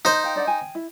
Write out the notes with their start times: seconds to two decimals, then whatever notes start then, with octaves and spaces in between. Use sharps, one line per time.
0.05 D#4 C5
0.24 F5 G5
0.36 D4 D5 F#5
0.47 G5 G#5
0.75 E4